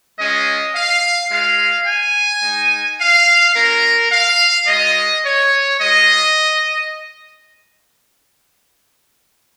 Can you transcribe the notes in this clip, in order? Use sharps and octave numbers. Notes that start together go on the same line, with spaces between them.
G#3 C#4 F4 D#5
F5
G#3 F4 F5
G#5
G#3 D#4
F5
A#3 C#4 F4 A#4
F5
G#3 F4 D#5
C#5
G#3 F4 D#5